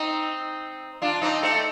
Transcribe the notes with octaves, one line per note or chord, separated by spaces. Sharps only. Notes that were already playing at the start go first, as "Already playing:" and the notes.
Already playing: C4 D#4
D4 F4
C4 D#4
A3 C4